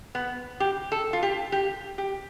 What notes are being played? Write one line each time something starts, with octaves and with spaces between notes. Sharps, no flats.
B3
G4
A4
F4
G4
G4
G4